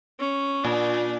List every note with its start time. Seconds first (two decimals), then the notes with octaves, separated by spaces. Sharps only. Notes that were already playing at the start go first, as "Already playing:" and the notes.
0.19 C#4
0.64 A#2 D4